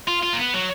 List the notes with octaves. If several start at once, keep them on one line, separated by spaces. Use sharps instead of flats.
F4
F4
A#3
B3
F#3